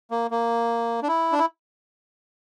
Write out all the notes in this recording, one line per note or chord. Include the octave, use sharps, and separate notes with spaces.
A#3
A#3
D4
E4
D4
E4